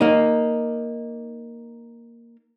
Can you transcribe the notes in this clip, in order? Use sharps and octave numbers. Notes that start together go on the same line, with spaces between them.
A#3 D#4